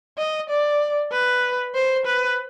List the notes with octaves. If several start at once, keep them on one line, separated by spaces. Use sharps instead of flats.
D#5
D5
B4
C5
B4